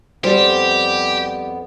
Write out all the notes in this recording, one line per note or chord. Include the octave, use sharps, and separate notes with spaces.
F2 G3 B3 G4 C5 D5